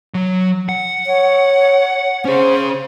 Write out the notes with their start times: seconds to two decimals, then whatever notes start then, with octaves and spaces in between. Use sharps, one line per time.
0.14 F#3
0.69 F#5
1.07 C#5
2.25 C#4 G#4 C5